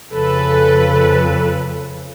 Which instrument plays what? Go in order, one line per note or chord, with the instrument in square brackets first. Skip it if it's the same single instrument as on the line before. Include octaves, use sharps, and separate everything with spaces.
[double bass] F2 C#3 [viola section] A4 B4